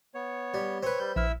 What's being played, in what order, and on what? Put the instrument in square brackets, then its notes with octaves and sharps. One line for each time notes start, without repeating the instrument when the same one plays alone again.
[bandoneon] B3 C#5
[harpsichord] G3
[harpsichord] C4 B4 [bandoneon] C#5
[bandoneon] G3 G6
[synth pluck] A#1 F6 [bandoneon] E4 E5 E6